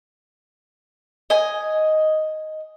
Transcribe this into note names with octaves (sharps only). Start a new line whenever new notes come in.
D#5 G#5